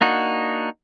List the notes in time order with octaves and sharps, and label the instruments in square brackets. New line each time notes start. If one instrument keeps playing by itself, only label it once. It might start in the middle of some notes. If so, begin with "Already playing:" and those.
[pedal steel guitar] A#3 D4 D#4 F#4